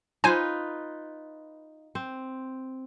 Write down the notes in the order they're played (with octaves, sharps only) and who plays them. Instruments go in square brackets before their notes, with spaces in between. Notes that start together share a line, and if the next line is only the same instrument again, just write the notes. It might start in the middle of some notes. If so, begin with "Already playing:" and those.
[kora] D#4 F4 B4 [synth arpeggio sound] C5 G#5
[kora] C4